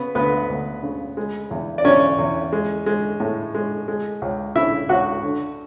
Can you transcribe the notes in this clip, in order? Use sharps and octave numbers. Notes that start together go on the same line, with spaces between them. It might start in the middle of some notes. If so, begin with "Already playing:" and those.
Already playing: C#3 B3 B4
D2 B3 B4
D2
C#3
G#3
E2
D5
E2 C#4 C#5
E2
G#3
G#3
A2
G#3
G#3
C#2
C#3 E4 E5
C#2 F#4 F#5
D3